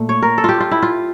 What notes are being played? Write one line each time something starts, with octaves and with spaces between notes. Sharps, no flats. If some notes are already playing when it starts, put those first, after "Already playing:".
Already playing: A#2 A3
C#5
A#4
A4
F4 G4
F4
E4
F4